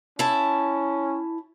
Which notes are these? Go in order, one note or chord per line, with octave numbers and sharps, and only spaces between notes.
C#4 E4 A5